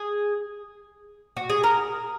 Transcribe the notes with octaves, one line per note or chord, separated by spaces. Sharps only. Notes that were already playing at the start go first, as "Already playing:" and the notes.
Already playing: G#4
F#4
G#4
A#4